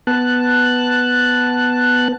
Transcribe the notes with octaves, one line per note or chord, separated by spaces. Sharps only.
B3 A5 F#6